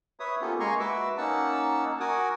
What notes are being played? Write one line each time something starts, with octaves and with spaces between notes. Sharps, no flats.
B4 C#5 E5 D#6
A#3 B3 C#4 F4 G4 A4
G#3 A#3 G#5 A#5 C6 C#6
F#4 B4 E5 D6 E6
A#3 C#4 D#4 F#5 A5 E6
F#4 A#4 F#5 G#5 D6 D#6